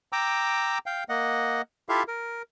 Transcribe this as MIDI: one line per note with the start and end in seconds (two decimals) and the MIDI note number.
0.13 0.78 79
0.13 0.78 82
0.13 0.78 86
0.13 0.78 88
0.86 1.04 77
0.86 1.04 79
1.09 1.62 58
1.09 1.62 75
1.09 1.62 78
1.89 2.03 64
1.89 2.03 65
1.89 2.03 67
1.89 2.03 69
1.89 2.03 76
1.89 2.03 77
2.08 2.42 70